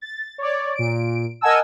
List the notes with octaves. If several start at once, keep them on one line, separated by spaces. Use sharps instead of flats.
A6
C#5 D5
A#2 D7
A#4 D#5 F#5 G#5 A5 E6